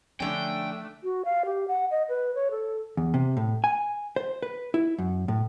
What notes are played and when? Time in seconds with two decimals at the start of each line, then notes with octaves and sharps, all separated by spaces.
0.20 D3 F3 A3 C#4 D4 G5
1.04 F#4
1.25 F5
1.45 G4
1.68 F#5
1.91 D#5
2.09 B4
2.35 C#5
2.51 A4
2.97 E2
3.14 C3
3.37 A2
3.64 G#5
4.16 C5
4.43 B4
4.74 E4
4.98 F#2
5.28 A2